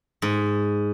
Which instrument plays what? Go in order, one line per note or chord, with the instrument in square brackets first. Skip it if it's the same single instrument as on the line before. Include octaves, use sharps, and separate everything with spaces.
[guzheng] G#2